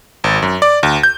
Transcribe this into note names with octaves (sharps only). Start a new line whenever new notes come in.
G#1
F#2
D5
D2
G6